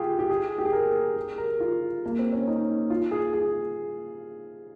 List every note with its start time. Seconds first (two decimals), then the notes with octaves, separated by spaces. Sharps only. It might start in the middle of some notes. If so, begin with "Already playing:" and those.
Already playing: F4 G4 G#4
0.19 G4
0.30 G#4
0.58 G4
0.65 G#4
0.73 A#4
1.16 G#4
1.38 A#4
1.60 F4
2.06 A#3
2.19 C4
2.32 C#4
2.47 D#4
2.90 F4
3.11 G#4
3.33 G#4